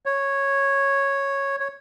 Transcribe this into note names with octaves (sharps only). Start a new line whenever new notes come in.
C#5
C#5